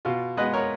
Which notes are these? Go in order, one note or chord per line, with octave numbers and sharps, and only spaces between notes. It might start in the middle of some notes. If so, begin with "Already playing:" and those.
B2 F4
G#3 B3 B4 D#5
A#4 C#5